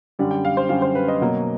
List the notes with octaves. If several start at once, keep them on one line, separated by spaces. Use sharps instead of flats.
F#2 D3 G3
G5
F5
C5
F#2 D3 G3 F5
C5
B4
D#5
B2 F#3 A#3